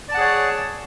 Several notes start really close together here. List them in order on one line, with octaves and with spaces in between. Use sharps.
D5 A5 F#5 G#4 C#5